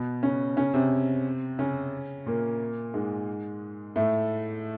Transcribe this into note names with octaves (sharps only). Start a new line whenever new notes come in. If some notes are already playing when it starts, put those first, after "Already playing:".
Already playing: B2 B3
C#3 C#4
C#3 C#4
C3 C4
C#3 C#4
A#2 A#3
G#2 G#3
A2 A3